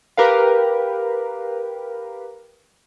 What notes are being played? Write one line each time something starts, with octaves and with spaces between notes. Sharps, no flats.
G4 A#4 B4 F5